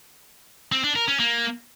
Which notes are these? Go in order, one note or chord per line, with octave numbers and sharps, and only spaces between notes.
C4
D4
A#4
C#4
A#3